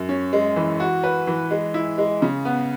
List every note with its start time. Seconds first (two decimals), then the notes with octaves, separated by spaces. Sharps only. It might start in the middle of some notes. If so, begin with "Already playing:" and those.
Already playing: F#2
0.09 C#4
0.33 G#3
0.56 E3
0.80 F#4
1.04 B4
1.27 E3
1.51 G#3
1.74 E4
1.98 G#3
2.22 C#3
2.45 B3